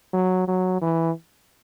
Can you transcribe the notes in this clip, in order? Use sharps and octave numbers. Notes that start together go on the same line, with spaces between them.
F#3
F#3
E3